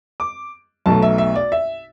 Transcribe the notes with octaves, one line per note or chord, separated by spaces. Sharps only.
D6
B1 B2 F#3 A3 A5
E5
E5
D5
E5